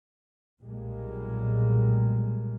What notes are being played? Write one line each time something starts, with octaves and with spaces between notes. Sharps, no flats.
B1 A#2 G3 G#3 A#3